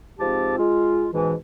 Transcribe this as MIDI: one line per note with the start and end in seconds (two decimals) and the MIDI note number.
0.19 0.55 44
0.19 0.55 53
0.19 0.55 60
0.19 0.55 67
0.19 0.55 81
0.58 1.07 56
0.58 1.07 65
1.13 1.34 44
1.13 1.34 47
1.13 1.34 52